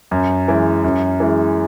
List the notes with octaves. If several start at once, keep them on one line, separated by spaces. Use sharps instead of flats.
F#2
E3 G#3
F#2
E3 G#3